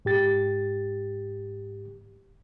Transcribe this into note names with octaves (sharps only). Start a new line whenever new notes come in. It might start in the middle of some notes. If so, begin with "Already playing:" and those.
G#2 G4 A6